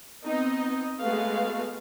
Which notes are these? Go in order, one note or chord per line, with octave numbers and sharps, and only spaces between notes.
B3 C4 D#4 D#5
G#3 A3 B3 F#4 B4 F5